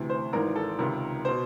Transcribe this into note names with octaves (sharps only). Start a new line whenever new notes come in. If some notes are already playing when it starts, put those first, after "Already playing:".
Already playing: D2 C3 E3
C5
G#1 G#2 E3 A#4
A4
C#2 C3 D#3 A#4
B2 C5